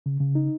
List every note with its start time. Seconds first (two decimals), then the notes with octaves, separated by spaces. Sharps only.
0.06 C#3
0.20 C#3
0.35 D#4